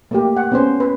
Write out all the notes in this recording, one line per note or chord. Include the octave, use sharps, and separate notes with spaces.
A3 A#3 G4
F#5
B3 C#4 C5
B4